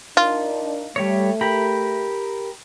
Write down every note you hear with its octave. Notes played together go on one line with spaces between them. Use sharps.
D4 D#4 F4 A#4
G3 A3 C#5
G4 A#4 B5